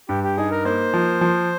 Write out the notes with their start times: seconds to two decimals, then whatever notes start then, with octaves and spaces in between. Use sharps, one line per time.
0.09 G2 G4
0.24 G4
0.37 D#4 G#4
0.51 A#4
0.65 A#3 C5
0.94 F3
1.21 F3